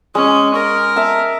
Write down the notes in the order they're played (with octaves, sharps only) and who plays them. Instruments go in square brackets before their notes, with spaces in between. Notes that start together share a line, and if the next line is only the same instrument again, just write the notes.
[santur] G#3 [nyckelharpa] C#4
[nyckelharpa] A#4
[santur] E5 A5 A#5